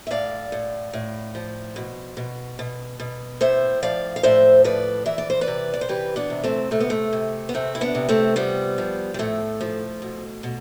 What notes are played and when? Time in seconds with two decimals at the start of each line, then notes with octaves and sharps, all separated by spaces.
0.07 E5
0.11 A2 D5 F5
0.52 A2
0.93 A2
1.35 F3
1.76 B2
2.17 B2
2.59 B2
3.00 B2
3.41 A2 C5 E5
3.83 F3 D5 F5
4.16 F5
4.23 A2 C5 E5
4.64 F3 B4 D5
5.06 E3 E5
5.18 D5
5.30 C5
5.41 B4 D5
5.48 C3
5.74 D5
5.81 C5
5.89 E3 G4 B4
6.16 B3 D4
6.30 C3
6.43 A3 C4
6.71 C3 A3
6.80 B3
6.90 A3
7.13 C3
7.49 B3
7.54 C3 A3 C4
7.75 E4
7.81 B3 D4
7.95 C3
8.09 A3 C4
8.36 F3 G3 B3
8.78 F3
9.14 G3
9.19 A2 A3
9.61 F3
10.02 B2
10.43 B2